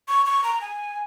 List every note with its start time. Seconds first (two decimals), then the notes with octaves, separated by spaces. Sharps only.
0.08 C#6
0.26 C#6
0.44 A#5
0.61 G#5